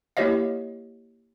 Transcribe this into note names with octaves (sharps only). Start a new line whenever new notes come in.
A#3 E4 G4 C#5 D#5 F5